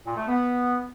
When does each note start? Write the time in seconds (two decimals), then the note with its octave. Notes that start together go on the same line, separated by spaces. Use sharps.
0.05 A#2
0.16 A3
0.27 B3